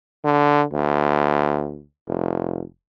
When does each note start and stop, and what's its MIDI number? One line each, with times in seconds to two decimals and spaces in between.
0.24 0.64 50
0.72 1.84 38
2.08 2.63 29